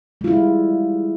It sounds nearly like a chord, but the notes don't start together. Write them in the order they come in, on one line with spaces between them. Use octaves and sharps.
G#3 F4 E4 G3